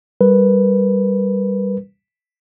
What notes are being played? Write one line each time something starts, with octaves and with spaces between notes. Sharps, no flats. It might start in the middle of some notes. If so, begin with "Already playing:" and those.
G3 A#4 B4